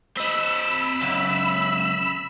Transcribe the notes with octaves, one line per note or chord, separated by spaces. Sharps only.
C4 D#5 B5 E6
C#2 F#2